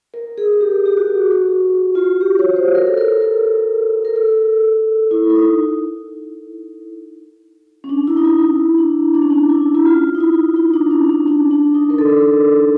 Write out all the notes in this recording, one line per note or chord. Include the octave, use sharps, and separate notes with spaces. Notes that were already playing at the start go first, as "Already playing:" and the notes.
A#4
G#4
G4
G4
F#4
F#4
F4
F#4
G4
C#5
C5
A#4
A4
A#4
A#4
A#4
A4
E4
E4
D#4
C#4
D4
E4
D#4
E4
E4
D4
D4
C#4
D4
E4
E4
F4
D#4
E4
D#4
D4
C#4
C#4
D4
D4
D#4
A#4
A4